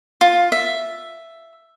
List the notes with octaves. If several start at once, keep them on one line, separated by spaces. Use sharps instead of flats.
F4
E5